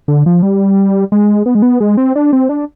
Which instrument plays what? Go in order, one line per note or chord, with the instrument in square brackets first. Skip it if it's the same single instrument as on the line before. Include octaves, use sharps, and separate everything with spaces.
[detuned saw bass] D3
F3
G3
G#3
B3
G#3
B3
G#3
C4
D4
C4
D4